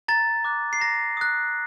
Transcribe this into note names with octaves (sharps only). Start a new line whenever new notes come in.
A#5 A6
D6 F#6
C7
A#5 A#6
D#6 F#6